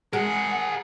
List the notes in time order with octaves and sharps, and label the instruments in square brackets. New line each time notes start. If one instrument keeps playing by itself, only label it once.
[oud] G#3 [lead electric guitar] G#4 A#4 [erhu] F#5